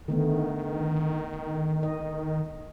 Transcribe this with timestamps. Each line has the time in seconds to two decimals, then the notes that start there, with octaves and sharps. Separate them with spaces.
0.08 D3 D#3 A3 B3
1.83 D#5